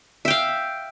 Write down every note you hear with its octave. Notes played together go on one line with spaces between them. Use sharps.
E5 F5 G5